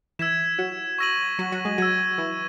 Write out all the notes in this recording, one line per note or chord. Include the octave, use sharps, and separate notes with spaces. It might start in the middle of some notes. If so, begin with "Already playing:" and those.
E3 E4 E6 G#6 B6 E7
F#3 F#4
C#6 E6 A#6 D#7 F#7
F#3 F#4
F#3 F#4
G#3 G#4
F#3 F#4 E6 G#6 D#7
E3 E4